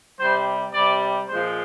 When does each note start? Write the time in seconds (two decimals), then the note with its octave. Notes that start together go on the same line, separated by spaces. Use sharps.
0.19 C3 G3 C5
0.74 C3 G3 D5
1.29 A#2 F3 G#3 C5